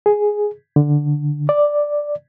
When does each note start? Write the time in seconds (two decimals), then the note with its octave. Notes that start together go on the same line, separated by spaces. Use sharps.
0.06 G#4
0.76 D3
1.49 D5